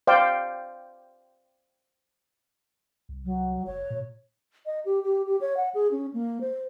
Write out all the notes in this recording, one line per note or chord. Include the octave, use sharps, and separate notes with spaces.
C5 D5 F5 G5
C2
F#3
F#1 C#5
A#2
D#5
G4
G4
G4
C#5
F#5
G#4
C#4
A#3
C5